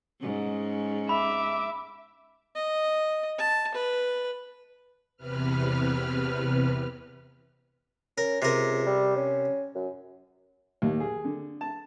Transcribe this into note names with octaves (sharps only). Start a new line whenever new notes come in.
G#2 C#4
E5 B5 D6
D#5
A5
B4
E2 C3 B4 F6
C#4 A#4
C#2 C3 A#4
G3
C#4
F#2
D#2
G#4
D3
A5